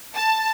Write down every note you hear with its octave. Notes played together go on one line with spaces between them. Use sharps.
A5